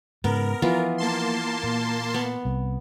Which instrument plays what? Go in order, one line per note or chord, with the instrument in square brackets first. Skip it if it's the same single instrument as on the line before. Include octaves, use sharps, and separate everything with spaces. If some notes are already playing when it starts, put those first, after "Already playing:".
[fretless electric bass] G#2 C#3 [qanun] B3 [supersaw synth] A#4
[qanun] E3 B3 F4 [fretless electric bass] F3
[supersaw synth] A#3 A5 C6
[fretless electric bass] A#2
[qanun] B3
[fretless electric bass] C2